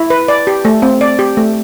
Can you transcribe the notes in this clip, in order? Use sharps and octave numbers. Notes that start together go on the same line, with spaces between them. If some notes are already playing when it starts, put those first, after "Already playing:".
Already playing: E4
B4
D5
G4
A3
C4
D5
G4
A3